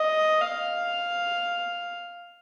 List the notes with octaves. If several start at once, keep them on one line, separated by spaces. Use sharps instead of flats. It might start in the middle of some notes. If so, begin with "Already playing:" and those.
Already playing: D#5
F5